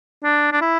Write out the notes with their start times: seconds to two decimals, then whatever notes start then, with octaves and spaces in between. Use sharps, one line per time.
0.24 D4
0.52 D4
0.61 E4